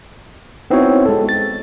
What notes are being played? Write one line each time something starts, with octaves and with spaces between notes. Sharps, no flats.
B3 C4 D#4 E4 F#4 C#5
G#3 A4
A6